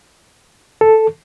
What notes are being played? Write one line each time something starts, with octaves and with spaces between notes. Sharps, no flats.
A4